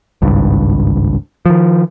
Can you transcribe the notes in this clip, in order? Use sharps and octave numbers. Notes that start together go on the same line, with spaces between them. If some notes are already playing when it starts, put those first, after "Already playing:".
G#1 C#2 G2
D#3 F3